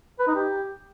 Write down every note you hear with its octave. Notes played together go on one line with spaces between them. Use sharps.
B4
D#4
G4